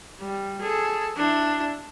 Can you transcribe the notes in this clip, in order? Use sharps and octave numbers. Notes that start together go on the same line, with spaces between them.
G3
G#4 A4
D4 E4